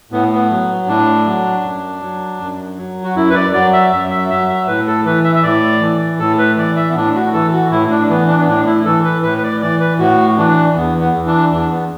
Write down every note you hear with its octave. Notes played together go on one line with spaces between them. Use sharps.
A2 B3
B3
F#3
A2 D4
F#3
F#2
F#3
F#2
F#3
F#4
F#2 E4
B4
D5
F#3 D5
E5
F#2 E5
E5
F#3 E5
E5
A2 B4
A4
E3 B4
E5
E5
A2 D5
E3
A2 A4
B4
E3 D5
E5
B3
A2 D4
F#4
E3 A4
F#4
A2 E4
D4
E3 B3
D4
B3
A2 D4
E4
E3 A4
B4
A2 B4
B4
D5
E3 D5
B4
A2 F#4
E3 D4
E2 B3
B3
E3
D4
E2 D4
B3